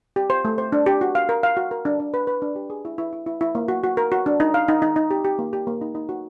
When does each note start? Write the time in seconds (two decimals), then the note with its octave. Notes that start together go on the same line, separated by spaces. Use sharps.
0.16 G4
0.30 C5
0.45 A3
0.58 C5
0.72 D4
0.86 G4
1.01 F#4
1.15 F5
1.29 A#4
1.43 F5
1.57 F#4
1.71 A#4
1.85 D4
2.00 D4
2.14 B4
2.27 B4
2.42 D4
2.56 G4
2.70 G#4
2.85 E4
2.98 E4
3.13 E4
3.26 E4
3.41 E4
3.55 A#3
3.68 F#4
3.83 F#4
3.97 A#4
4.12 F#4
4.26 D4
4.40 D#4
4.54 F5
4.68 D#4
4.82 D#4
4.96 D#4
5.11 G4
5.24 G4
5.39 A#3
5.53 G4
5.67 A#3
5.81 D#4
5.95 D#4
6.09 F#4